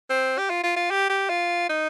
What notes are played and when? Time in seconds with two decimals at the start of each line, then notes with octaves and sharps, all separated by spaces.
0.09 C4
0.38 G4
0.50 F4
0.63 F4
0.76 F4
0.90 G4
1.09 G4
1.29 F4
1.69 D#4